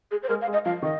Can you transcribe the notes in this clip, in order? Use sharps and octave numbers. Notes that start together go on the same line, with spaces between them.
G#4
C5
G#3 A#4
F5
G#3
D#5
F3 F5
D#3 D#5